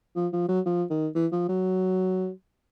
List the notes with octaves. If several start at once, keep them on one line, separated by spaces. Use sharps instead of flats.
F3
F3
F#3
F3
D#3
E3
F3
F#3